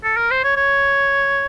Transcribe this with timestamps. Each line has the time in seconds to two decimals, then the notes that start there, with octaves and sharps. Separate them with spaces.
0.04 A4
0.17 A#4
0.31 C5
0.44 C#5
0.57 C#5